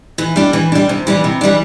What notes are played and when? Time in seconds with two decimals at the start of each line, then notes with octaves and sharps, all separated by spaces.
0.18 E3
0.36 G3 D4
0.53 E3
0.72 G3 D4
0.89 C3
1.07 E3 G3 D4
1.24 C3
1.41 E3 G3 D4